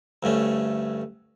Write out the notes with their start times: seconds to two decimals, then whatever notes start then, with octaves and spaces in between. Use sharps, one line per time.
0.23 D2 G2 A3 C#4